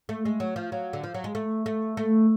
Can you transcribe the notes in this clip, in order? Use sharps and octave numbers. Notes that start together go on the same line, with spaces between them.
A3
G#3
F#3
F3
F#3
D3
F3
F#3
G#3
A3
A3
A3